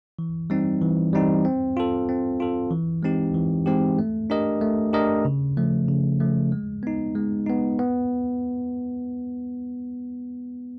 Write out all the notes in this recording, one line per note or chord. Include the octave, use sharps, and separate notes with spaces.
E3
G3 C4 D#4
E3
G3 C4 D#4
C4
F4 A4
C4
F4 A4
E3
G#3 C4 D#4 G4
E3
G#3 C4 D#4 G4
A3
D4 G4 A#4 D#5
A3
D4 G4 A#4 D#5
C#3
F3 A3
C#3
F3 A3
G#3
B3 D#4
G#3
B3 D#4
B3